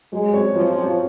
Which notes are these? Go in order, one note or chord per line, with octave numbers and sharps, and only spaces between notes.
F#3 G#3
C4 F#4 C#5
F3 F#3
C4 F#4 C#5